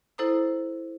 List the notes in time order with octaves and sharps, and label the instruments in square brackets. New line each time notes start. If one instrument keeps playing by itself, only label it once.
[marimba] E4 A4 C5 A#5 D#6